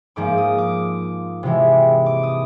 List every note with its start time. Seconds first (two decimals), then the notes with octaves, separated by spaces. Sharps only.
0.16 G#2 F3 A#3 D6
0.38 D#6
0.58 D6
1.43 C3 E3 G#3
2.06 D6
2.23 D#6